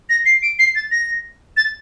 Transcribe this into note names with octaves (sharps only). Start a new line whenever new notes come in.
A#6
C7
D7
C7
A6
A#6
A6